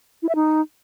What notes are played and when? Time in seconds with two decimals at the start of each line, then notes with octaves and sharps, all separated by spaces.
0.23 E4
0.29 E5
0.35 D#4